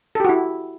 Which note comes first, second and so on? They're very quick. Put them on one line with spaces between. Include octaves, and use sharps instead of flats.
A4 G4 F#4 E4